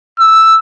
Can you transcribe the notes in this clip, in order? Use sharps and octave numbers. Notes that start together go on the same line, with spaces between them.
E6